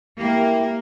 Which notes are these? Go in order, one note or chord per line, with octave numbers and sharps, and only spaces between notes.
A#3 E4 G4